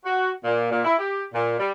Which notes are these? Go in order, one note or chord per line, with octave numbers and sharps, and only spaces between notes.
F#4
A#2
A#2
E4
G4
A#2
G3